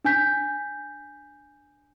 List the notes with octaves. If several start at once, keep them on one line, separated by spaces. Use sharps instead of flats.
D4 G#5 G6 B6